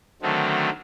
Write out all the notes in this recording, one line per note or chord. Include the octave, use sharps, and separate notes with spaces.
D3 D#3 F#3 A3 C4